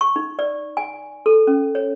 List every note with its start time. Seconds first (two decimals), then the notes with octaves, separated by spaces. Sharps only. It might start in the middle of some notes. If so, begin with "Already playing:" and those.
0.01 C#6
0.16 D#4
0.39 D5
0.77 G#5
1.26 A4
1.47 C#4
1.75 C#5